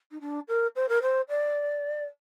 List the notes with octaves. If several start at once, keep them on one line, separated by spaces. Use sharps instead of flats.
D#4
D4
A#4
C5
A#4
C5
D5